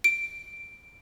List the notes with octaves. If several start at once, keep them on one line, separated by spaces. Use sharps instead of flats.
D7